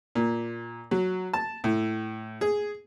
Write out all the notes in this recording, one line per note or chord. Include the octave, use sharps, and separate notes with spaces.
A#2
F#3
A5
A2
G#4